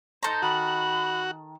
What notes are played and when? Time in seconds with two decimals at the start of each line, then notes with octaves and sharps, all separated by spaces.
0.23 D#4 A4 C5 A#5
0.42 D#3 F#4 B5